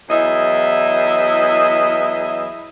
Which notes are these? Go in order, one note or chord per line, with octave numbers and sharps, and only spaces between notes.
E2 F#3 E4 D#5 E5